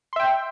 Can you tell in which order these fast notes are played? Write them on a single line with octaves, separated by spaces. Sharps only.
C6 E5 G5